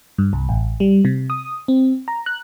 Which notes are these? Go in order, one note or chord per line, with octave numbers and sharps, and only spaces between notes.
G2
C2
A1
G3
C3
D#6
C4
A#5
F#6